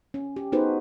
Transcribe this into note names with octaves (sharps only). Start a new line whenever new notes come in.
C#4
G4
B3 D#4 F#4 G#4 B4 C5